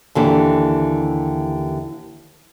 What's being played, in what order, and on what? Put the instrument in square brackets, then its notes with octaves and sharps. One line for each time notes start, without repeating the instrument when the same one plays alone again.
[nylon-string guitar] D#2 D3 E3